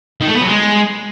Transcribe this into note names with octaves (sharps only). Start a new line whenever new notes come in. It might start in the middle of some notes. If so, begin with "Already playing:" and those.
D#3
A3
B3
F#3
G#3